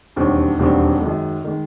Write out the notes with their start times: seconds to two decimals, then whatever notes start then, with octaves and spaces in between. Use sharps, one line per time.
0.16 E1 D#2 D3 G3 C4
0.59 E1 D#2 D3 G3 C4
1.00 F#2 D#3 G#3
1.44 D#3 G#3